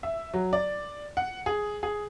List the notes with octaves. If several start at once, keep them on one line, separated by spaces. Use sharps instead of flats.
E5
F#3
D5
F#5
G#4
G#4